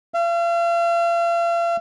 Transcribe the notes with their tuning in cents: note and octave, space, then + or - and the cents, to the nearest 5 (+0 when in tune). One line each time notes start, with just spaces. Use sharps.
F5 -40